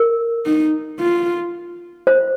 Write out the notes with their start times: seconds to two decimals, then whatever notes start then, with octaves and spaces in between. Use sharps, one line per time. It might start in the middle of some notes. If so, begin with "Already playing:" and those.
Already playing: A#4
0.46 D#4
0.99 F4
2.07 C5